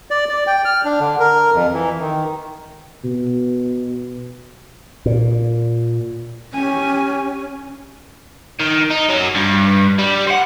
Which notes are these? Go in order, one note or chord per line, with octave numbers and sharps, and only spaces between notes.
D5
D5
G5
F6
D4
D3
A#4
F2
E3
D#3
B2
A#2
C#4 G4 G#5
D#3
D#4
F#3 C#4
G2
G3
C5 F#5